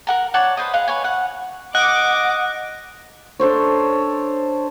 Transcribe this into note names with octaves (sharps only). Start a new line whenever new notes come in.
A#4 F#5 A#5
C#5 D5 F#5 A5
B4 C5 D#5
G#4 D#5 F5 F#5
B4 C#5 G#5
F#5
D#5 F#5 D6 F#6
D4 A4 C5 C#5